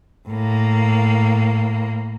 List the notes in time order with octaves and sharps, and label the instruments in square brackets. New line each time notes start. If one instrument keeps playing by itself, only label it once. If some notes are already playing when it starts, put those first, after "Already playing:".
[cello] A2 A#3